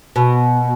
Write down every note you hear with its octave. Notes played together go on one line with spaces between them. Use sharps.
B2